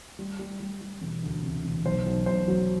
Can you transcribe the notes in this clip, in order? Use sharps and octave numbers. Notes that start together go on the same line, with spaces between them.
G3
G3
G3
G3
E1
D2
C3
E1
B1 C5
B1
B1 C5
F#3